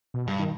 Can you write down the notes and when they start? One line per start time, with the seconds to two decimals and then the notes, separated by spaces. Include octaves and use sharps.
0.14 B2
0.28 G2
0.39 D#3